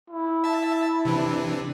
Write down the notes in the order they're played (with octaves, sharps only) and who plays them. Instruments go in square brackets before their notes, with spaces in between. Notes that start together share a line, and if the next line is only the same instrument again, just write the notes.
[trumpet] E4
[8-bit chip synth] E5 A5
C3 E3 D4